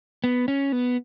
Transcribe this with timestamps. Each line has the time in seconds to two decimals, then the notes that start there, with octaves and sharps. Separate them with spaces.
0.24 B3
0.48 C#4
0.72 B3